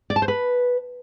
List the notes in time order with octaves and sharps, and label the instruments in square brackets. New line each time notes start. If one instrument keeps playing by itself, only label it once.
[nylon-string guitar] D5
A5
C5
B4